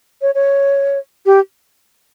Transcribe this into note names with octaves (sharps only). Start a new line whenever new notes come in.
C#5
C#5
G4